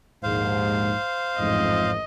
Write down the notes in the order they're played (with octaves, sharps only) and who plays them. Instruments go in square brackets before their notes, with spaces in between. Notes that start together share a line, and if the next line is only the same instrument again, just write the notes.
[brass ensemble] A#1 D#2 G#2 [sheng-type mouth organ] C5 F5
[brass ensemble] A1 F2 G#2 [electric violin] D#5